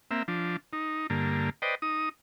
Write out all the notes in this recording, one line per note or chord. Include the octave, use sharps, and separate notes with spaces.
A#3 C4 E5
F3 D4
D#4
G2 D3 A#3
B4 C5 D5 D#5 G5
D#4 D#6